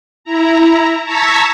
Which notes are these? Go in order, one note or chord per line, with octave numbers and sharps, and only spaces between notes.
E4 A#5
A5 A#5 C#6 E6 G#6 B6